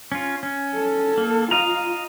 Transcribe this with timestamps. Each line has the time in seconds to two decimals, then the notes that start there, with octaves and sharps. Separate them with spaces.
0.12 C#4 F4
0.43 C#4
0.74 A4
1.17 A#3
1.51 F4 D#5 F5 A#5